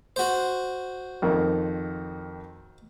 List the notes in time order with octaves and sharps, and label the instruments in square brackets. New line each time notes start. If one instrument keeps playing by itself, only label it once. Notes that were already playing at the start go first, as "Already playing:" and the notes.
[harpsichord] F#4 C5
[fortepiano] F2 D#3